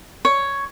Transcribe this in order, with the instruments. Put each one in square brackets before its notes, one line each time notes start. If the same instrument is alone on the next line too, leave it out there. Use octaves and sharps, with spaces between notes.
[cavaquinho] C#5